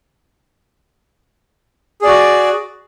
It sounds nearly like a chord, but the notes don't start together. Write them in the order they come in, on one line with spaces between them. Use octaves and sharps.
G#4 D5 F#4